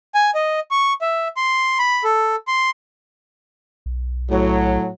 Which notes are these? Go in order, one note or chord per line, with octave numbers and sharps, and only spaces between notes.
G#5
D#5
C#6
E5
C6
B5
A4
C6
B1
A2 F#3